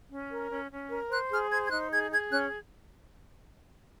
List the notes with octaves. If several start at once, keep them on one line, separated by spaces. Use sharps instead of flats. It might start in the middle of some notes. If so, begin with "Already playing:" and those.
C#4
A#4
C#4
C#4
A#4
C5 F#6
G#4 F6
C5 G#6
G#6
D#4 F#6
G#4 G#6
G#4 G#6
C#4 F#6